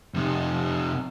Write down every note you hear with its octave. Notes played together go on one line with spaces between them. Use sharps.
F2 C3